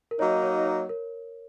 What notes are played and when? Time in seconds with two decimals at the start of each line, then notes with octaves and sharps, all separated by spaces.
0.11 A#4
0.19 F#3 A#3 D#4 C#5
0.43 C#5
0.65 C#5
0.89 A#4